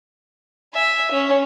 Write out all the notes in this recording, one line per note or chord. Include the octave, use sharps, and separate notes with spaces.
E5 G#5
C#4